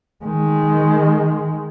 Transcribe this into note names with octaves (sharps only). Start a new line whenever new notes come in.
D#3 G#3